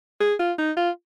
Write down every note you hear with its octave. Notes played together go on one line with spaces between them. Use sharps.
G#4
F4
D#4
F4